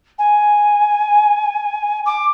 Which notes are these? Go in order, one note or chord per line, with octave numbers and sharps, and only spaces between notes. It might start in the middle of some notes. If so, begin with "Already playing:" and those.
G#5
D6